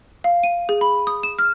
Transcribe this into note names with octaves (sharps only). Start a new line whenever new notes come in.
F5
D#7
G#4
B5
D#6
E7
F6